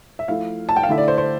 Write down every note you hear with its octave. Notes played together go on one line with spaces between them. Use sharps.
E5
F3 A3 E4 F5
A5
G5
F5
D3 A3 E4 E5
D5
C5
C5